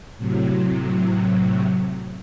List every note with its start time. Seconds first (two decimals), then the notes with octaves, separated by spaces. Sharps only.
0.17 A2 C3 F#3